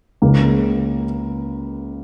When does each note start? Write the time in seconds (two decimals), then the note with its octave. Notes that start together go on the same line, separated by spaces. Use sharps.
0.22 C#2 C#3 A#3